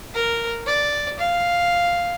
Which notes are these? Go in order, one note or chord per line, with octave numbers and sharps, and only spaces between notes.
A#4
D5
F5